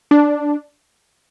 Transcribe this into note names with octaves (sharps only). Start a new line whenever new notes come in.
D4